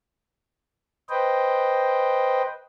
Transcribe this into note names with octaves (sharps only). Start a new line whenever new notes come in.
B4 C5 D#5 G5